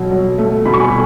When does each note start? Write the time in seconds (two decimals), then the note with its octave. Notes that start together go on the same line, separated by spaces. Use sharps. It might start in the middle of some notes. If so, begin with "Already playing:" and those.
Already playing: B2 F#3
0.11 F#3
0.38 A3
0.66 B2 B5
0.74 C#6
0.80 G#5 B5